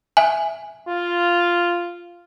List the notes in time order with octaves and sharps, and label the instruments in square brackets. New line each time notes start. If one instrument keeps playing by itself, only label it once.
[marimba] E5 G#5
[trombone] F4